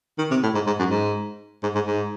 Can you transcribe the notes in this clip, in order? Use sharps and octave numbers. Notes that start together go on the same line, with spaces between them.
D#3
C3
A2
G#2
G#2
F#2
G#2
G#2
G#2
G#2